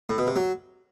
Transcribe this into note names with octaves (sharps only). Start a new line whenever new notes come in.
A2
B2
C3
F#3